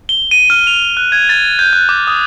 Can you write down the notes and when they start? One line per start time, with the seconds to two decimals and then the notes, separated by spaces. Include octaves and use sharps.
0.09 G7
0.31 D#7
0.50 F6
0.67 F7
0.97 F#6
1.12 G#6
1.29 A6
1.59 G6
1.73 F#6
1.89 D6
2.07 D#6